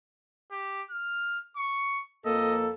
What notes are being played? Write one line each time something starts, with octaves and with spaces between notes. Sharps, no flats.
G4
F6
C#6
F2 A#3 A4 D#5